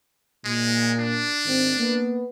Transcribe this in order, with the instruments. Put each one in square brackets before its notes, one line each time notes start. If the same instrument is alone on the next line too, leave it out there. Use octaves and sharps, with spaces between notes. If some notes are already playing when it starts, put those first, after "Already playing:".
[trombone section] A#2 [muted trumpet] G#3
[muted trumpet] D4
[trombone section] G#2 D#3 C4
A#3 B3